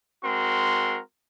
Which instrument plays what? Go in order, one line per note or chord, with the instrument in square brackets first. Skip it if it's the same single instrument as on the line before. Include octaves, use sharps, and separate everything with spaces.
[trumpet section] G#3 C4 F#4 A#4 C6